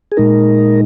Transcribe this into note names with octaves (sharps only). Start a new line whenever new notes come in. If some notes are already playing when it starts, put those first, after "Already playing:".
G#4
A#2 G#3 D#4 A#4